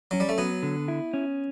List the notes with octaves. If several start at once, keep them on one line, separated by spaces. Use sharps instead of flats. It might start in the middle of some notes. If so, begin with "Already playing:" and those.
F#3 C#4
G3
A3
F#3 B3
D3
E4
C#4